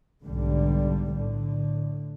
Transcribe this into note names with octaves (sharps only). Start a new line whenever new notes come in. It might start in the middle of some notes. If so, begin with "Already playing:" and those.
B1 G#2 D3 G3
A2 D3